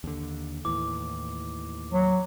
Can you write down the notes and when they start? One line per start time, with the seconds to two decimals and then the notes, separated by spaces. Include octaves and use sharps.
0.04 D#2 D3
0.65 D#2 A2 E3 D6
1.93 F#3